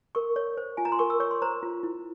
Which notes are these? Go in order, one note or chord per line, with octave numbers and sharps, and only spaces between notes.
A#4 C#6
C#5
C5
F4 G#5
A#5
C6
A#4 C#6
E6
C#5 C#6
C6
C5 A#5
F4
E4